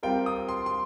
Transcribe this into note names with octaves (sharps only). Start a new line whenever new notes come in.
G3 C4 F4 A#4 G5
D#6
C6
C6